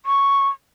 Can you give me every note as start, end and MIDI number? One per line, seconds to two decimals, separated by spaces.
0.06 0.49 85